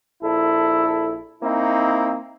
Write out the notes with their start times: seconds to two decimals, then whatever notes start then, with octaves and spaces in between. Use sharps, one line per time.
0.23 A#1 E4 A4
1.43 A#3 C4 D#4 E4